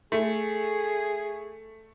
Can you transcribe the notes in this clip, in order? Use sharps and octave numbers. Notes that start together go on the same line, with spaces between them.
A3 G#4